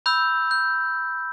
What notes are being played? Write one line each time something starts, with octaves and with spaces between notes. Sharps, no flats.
B5 E6 G6
G6